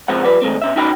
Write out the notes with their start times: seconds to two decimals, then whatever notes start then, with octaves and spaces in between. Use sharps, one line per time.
0.08 C#2 F3 G#3 C4 F#5
0.24 F3 G3 B4 D5
0.42 D#3 G#3 A3 C4
0.62 B2 C#4 E5
0.76 C#4 D#4 F#4 G5 B5